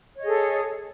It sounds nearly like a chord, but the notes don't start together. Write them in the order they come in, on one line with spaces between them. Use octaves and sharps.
C#5 D#5 G#4 A4